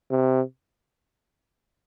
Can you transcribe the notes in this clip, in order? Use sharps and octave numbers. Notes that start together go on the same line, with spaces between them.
C3